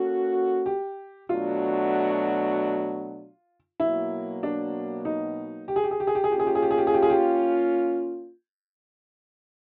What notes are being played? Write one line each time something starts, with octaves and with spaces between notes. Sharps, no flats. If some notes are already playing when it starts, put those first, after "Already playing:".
Already playing: A#3 C#4 F#4 A4
G4
B2 F#3 A3 D4 F4 F#4
B2 F#3 A#3 E4
D4
D#4
G4
G#4
G4
G#4
G4
G#4
G4
G#4
A#3 C#4 F4 G4
G#4
G4
G#4
G4
G#4
G4
G#4
G4
G#4
G4